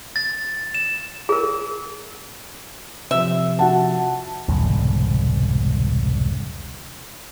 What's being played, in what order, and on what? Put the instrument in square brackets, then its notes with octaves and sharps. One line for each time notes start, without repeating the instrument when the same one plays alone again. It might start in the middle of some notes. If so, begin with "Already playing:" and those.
[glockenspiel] A6
E7
[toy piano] G#4 A#4
[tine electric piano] C3 F3 [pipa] E5
[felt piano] F#4 F#5 A5
[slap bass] E1 C2 G#2 D3